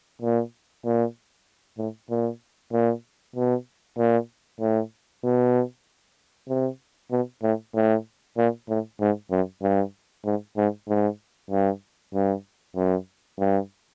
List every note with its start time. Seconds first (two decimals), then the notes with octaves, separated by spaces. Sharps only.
0.22 A#2
0.85 A#2
1.78 A2
2.10 A#2
2.73 A#2
3.36 B2
3.98 A#2
4.61 A2
5.24 B2
6.49 C3
7.11 B2
7.43 A2
7.75 A2
8.38 A#2
8.69 A2
9.01 G#2
9.31 F#2
9.62 G2
10.25 G#2
10.57 G#2
10.89 G#2
11.50 G2
12.14 G2
12.76 F#2
13.39 G2